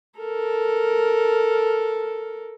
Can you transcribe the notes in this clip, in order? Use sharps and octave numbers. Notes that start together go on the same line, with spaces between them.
A4 A#4